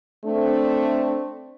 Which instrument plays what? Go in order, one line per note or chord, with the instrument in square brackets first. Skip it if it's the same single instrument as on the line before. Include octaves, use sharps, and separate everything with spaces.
[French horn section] A3 C4 D4